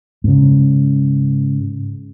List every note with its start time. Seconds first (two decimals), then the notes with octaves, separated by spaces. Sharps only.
0.24 G#2 C#3